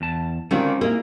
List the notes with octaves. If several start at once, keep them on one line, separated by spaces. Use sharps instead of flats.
E2 A5
D3 D#3 G#3 C4 C#4 F4
A#3 D#4 E4 G#4